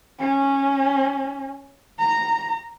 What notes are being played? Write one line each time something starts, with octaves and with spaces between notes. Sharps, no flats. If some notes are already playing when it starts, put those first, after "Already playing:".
C#4
A#5